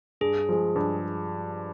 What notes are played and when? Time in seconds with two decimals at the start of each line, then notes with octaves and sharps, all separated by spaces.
0.21 G2 G#4
0.49 F3 G#3
0.76 G2